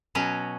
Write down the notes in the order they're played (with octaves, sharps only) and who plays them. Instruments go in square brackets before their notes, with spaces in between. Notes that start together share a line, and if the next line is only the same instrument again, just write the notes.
[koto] B2 F#3 C#4